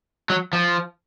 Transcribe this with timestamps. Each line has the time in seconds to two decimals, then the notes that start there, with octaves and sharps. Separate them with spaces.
0.30 F#3
0.53 F3